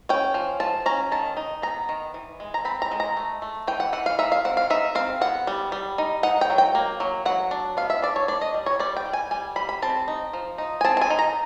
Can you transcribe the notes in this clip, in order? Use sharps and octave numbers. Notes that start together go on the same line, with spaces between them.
C#4 G5
F3
F3 A5
C#4 A#5
D#3 A5
D#4
B3 A#5
D#3
E3
G#3
A#5
C4 B5
A#5
G#3
A#5
A3
A3
E3 G5
F#5
E3 F#5
F5
D#4 E5
F5
C4 F#5
F5
D#4 E5
C4 F5
B3 F#5
G3
G3
D#4
D#4 F#5
G5
F#3
G5
A#3
F#3
F#3 F#5
D4
B3 F5
E5
D4 D5
C#5
D4 D5
D#5
G3
C#5
G3 D5
G5
G3
G#5
G3 G#5
G3 B5
B5
C4 A5
D#4
F3
D#4
G#5
C4 A5
A5
G#5
D#4
A#5